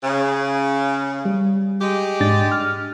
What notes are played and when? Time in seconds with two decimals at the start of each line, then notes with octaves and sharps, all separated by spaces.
0.04 C#3
1.25 G3
1.81 G#3 G4
2.20 G#2 D4 A6
2.52 F6